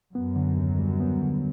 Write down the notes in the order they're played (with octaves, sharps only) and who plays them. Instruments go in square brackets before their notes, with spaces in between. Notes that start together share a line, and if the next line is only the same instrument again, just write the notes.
[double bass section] F#2 [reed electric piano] B3
[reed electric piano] D3
D#2
G3
B3
D3